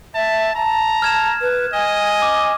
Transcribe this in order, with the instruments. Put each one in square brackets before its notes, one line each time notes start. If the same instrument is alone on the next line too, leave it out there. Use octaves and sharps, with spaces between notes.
[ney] E5 [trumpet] A5
[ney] A5 [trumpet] A#5
[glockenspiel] F6 G#6 E7
[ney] B4
[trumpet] D#5 [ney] G#5
[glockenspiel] D6